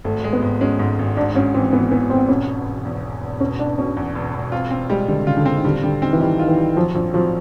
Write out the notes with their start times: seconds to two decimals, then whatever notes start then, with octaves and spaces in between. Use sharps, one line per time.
0.04 G#1 A3
0.24 G#3
0.33 B3
0.42 G#1
0.61 G#3 C#4
0.79 G#2
0.99 G#1
1.17 G#2 D4
1.35 G#2 C#4
1.54 E3 C4
1.72 E3 B3
1.92 E3 B3
2.09 G#1 C4
2.29 E1 C#4
2.47 B2
2.66 E1
2.85 E2
3.03 E1
3.21 E1
3.40 B2 C#4
3.59 E1 D4
3.78 B2 C#4
3.97 E2
4.15 E1
4.34 E1
4.52 C4 F4
4.71 C4
4.90 G3 G#3
5.08 D3 G3
5.27 C#3 F4
5.37 D3
5.45 C4
5.56 D#3
5.64 D3 G3
5.83 D3 G3
6.02 D#3 C4
6.13 E3
6.20 D#3 G3
6.39 D#3 F4
6.48 E3
6.57 G3
6.76 F3 F#3
6.95 A#1 F3
7.14 F3 F#3